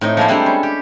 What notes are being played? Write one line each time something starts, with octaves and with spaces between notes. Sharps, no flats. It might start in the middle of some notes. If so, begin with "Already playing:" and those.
A2 C4 D#4
F3 G#3 A#3 E4 C5
G3 G#3 C4 D4 E4 A4
C#4
G4